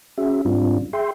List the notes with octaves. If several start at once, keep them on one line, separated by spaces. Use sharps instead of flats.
C#4 F#4 G#4 E5
G#2 G3 C4 D4 F4
G#4 E5 G5 C6